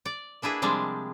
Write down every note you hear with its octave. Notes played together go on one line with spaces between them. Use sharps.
D5
A#3 D4 E4 G#4 B4
C3 F3 G3 G#3 C4 D4